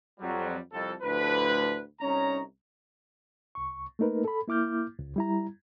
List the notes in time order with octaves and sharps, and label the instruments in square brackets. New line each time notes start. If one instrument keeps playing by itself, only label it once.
[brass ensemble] F2 F#3 G3
C2 F2 A4
D2 A2 D3 F3 B4
C2 C#4 D#4 C#5 A#5
[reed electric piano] C2 C#6
A3 A#3 D#4 A#4 B4
A4 B5
A#3 E4 D6 F6 G6
C#2
G3 E4 A#5